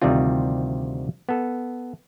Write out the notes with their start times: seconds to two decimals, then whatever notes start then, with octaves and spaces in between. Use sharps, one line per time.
0.02 D2 C3 D#3 G3 C4 F4
1.29 B3 A4